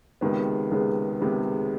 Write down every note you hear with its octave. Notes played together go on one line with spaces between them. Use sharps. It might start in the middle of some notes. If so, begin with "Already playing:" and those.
C#2 C3 D#3 G#3 B3
C#2 C3 D#3 G#3 B3
C#2 C3 D#3 G#3 B3